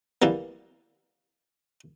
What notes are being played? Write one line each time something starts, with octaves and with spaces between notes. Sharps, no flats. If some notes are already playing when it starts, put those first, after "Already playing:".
E3 G3 A#3 B3